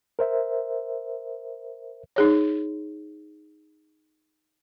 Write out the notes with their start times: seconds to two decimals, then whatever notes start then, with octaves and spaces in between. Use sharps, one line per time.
0.19 A#4 C5 E5
2.16 D#4 G#4 C#5